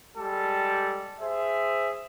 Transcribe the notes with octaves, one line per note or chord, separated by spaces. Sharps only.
G3 G#3 G4 A4
G#4 C5 E5